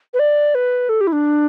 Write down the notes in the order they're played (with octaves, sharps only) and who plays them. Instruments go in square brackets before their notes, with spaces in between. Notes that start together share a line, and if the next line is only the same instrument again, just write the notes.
[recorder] B4
D5
B4
A4
G4
E4
D4